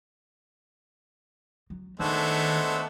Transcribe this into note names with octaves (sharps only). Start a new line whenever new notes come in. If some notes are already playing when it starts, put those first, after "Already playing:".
F#3
D#3 G#3 A3 B3 D4 C5 E6